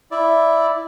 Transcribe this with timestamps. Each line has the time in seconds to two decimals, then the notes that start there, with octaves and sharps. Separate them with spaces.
0.11 E4 D5